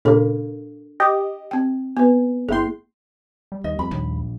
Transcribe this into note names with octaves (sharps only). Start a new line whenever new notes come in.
A#2 C#3 A#3 D4 A4
G4 D#5
C4 G5
B3 B4
G1 A#3 E4 G#4 C6
G3
D#2 D#5
F2 B5
A#1 D#2